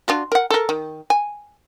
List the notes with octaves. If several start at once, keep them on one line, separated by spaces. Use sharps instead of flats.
D4 F4 F#4
A#4 F#5
A4 A#4
D#3
G#5